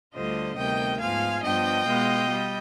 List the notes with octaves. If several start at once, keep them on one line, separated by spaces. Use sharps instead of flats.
D2 D3 G3 D4 F4 C5 D#5
D2 C3 D#3 G3 B3 D#5 G5
G#2 F3 B3 F4 F5 G#5
G2 F3 B3 D4 D#5 G5
B2 G#3 B3 F4
G3